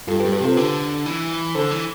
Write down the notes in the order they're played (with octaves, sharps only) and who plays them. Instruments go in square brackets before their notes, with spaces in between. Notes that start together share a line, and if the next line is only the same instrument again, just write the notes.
[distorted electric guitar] G2 [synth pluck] F4 A4
[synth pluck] G4 B4
[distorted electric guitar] G2
[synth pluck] G4 B4
[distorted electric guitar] C3 [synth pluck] F4 A4
[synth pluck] C5
[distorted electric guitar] D3 [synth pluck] G4 B4
[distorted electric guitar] E3
[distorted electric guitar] D3 [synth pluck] A4 C5
[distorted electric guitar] E3